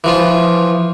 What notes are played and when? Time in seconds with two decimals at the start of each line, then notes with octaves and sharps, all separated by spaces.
0.04 E3 F3 F4